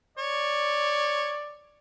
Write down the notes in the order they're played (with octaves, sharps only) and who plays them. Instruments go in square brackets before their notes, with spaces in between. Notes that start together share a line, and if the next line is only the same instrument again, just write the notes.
[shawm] C#5 [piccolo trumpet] D5